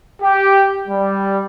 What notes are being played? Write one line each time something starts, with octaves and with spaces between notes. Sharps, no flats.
G4
G3